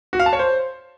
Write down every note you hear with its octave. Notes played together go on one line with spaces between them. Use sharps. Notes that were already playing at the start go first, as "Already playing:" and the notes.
F#4
F5
A5
C#5
C5